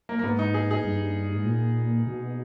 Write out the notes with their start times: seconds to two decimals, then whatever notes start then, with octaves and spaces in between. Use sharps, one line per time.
0.09 A#3
0.19 A#3
0.24 G#2 B3
0.39 D#4
0.54 G#4
0.71 G#4
0.85 G2
1.34 G#2
1.45 A#2
2.07 B2